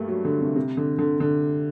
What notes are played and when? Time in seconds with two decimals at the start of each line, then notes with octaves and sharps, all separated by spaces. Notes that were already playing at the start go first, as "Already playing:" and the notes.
Already playing: G2 G3 A3 A#3
0.08 F#3
0.25 D3
0.41 C3
0.56 C3
0.77 D3
0.99 D3
1.20 D3